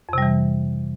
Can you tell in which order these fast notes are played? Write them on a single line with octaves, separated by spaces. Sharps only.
F2 C3 G3 E3